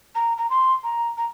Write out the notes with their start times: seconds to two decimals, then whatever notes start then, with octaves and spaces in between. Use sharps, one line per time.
0.15 A#5
0.37 A#5
0.50 C6
0.83 A#5
1.17 A#5